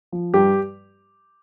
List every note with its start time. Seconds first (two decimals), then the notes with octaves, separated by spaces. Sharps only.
0.12 F3
0.34 G2 G4